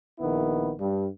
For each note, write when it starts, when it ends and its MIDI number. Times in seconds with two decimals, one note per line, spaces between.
0.19 0.71 34
0.19 0.71 51
0.19 0.71 59
0.19 0.71 64
0.79 1.06 43